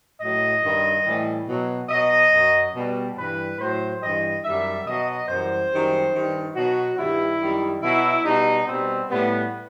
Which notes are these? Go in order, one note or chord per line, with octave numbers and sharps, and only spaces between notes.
A2 F#3 D#5
G2 D#3 G3
A2 E3 G3
B2 F#3
B2 F#3 D#5
F#2 F#3
B2 G3
G2 E3 G3 B4
A2 F#3 C5
G2 E3 G3 D#5
F#2 D#3 G3 E5
B2 F#3 D#5
F#2 E3 G3 C5
F#2 D#3 G3
G2 D#3 G3
B2 F#3 F#4
G2 D#3 G3 E4
F#2 D#3 G3
B2 F#3 E4
B2 G3 D#4
B2 G3 C4
A2 G3 B3